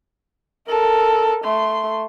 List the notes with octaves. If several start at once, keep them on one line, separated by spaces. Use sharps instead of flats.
A4 A#4
A3 C6